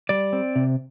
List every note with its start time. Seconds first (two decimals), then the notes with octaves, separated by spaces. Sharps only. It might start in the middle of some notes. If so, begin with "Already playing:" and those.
0.09 G3 D5
0.33 C4
0.56 C3